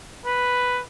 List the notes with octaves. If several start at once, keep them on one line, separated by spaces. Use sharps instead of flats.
B4